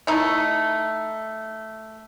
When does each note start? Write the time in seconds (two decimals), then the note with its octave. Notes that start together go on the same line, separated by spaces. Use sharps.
0.07 A3 D#4 E4